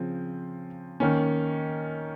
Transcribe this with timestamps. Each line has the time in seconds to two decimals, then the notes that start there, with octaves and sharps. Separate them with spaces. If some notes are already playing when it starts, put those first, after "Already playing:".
Already playing: C#3 F3 C4
1.00 D#3 A#3 C#4